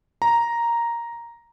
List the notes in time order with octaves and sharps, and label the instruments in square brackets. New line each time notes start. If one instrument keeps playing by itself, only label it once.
[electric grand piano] A#5